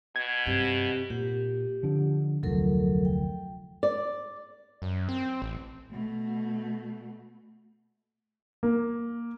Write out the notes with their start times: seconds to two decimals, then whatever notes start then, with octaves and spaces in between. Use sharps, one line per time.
0.16 B2 G#6
0.47 G2 C3
1.10 A#2 G4
1.83 D3 F3
2.43 F1 D2 F3 F#3 A4 A#4
3.05 G5
3.83 D5
4.82 F#2
5.09 C4
5.42 A1
5.91 B2 A3
8.63 A#3